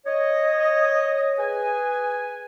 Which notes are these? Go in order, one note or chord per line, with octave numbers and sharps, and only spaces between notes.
C#5 D#5
G#4 B4 G#5